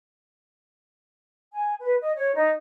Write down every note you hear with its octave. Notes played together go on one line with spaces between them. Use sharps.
G#5
B4
D#5
C#5
D#4